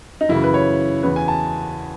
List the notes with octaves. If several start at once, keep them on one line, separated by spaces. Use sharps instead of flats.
D#4
F#2 C#3 E3 E4
B4
C#5
E2 C#3 E3 B4
G#5
A5